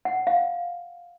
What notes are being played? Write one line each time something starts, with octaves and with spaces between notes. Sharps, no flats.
F#5
F5